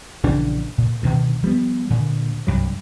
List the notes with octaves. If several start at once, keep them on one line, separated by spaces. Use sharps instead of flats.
A#1 C#3 E3 D4
A#2
D2 G2 B2 D#3
F3 G3 A3 B3
D2 A#2 D3
C2 G2 F#3